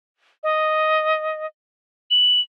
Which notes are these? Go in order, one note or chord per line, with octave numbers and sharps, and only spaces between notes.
D#5
F#7